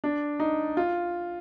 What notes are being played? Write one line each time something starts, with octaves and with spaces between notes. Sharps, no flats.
D4
D#4
F4